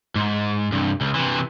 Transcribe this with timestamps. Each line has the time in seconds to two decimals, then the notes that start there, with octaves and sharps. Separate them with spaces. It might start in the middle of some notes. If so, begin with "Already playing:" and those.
0.16 G#2
0.72 C2 G2
1.01 C#2
1.15 C3 E3